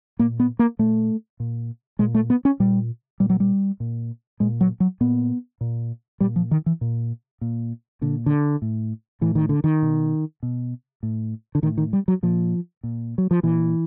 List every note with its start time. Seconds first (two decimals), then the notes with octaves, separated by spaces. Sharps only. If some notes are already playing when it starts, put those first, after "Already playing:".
0.19 A#2 A#3
0.40 B3
0.59 A#3
0.79 A#2 A3
1.40 A#2
1.99 A#2 G#3
2.15 A3
2.30 B3
2.45 C#4
2.60 A#2 G3
3.20 A#2 G3
3.30 F#3
3.40 G3
3.80 A#2
4.40 A#2 G#3
4.61 F#3
4.80 F#3
5.01 A#2 B3
5.61 A#2
6.20 A#2 G3
6.36 F3
6.51 D#3
6.66 E3
6.81 A#2
7.41 A#2
8.01 A#2 D3
8.26 D3
8.62 A2
9.21 A2 E3
9.35 D#3
9.49 D3
9.64 D#3
9.82 B2
10.43 B2
11.03 A2
11.55 D3
11.62 A2 D#3
11.78 D#3
11.93 G3
12.08 F#3
12.23 A#2 F3
12.83 A#2
13.18 F#3
13.31 F3
13.43 A#2 E3